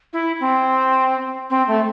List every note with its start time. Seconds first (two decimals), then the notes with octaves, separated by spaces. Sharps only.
0.13 E4
0.40 C4
1.50 C4
1.68 A3